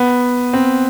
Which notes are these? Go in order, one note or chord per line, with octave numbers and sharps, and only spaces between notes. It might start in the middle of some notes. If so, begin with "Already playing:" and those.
Already playing: B3
C4